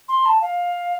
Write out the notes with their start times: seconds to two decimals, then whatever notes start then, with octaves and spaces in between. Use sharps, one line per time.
0.09 C6
0.26 A5
0.41 F5